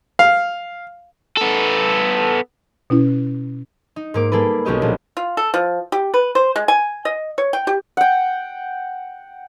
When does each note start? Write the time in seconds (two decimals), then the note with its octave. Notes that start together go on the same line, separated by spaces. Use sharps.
0.19 F5
1.37 B3 A4
2.90 B2 C#4 E4
3.96 D#4
4.14 G#2 A#3 D6
4.32 G3 A#3 G#4 A4 B4
4.65 B1 C#4 F#4 G4 D#5 G6
4.82 A#1
5.17 F4
5.37 A4
5.54 F3
5.92 G4
6.14 B4
6.35 C5
6.56 G#3
6.68 G#5
7.05 D#5
7.38 C#5
7.53 G5
7.67 G4
7.97 F#5 G5